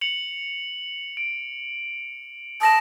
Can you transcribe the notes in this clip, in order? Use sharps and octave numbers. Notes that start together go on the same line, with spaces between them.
C#7 F7 F#7
D7
A5 D#6 A#6 E7